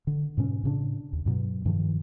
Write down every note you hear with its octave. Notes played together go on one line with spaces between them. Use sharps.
D3
G#2 B2 C#4
A2 C#3 D4
D#2
G2 B2 F#3
G2 B2 D#3 F3